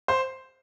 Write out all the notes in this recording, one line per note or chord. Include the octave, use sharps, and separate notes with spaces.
C5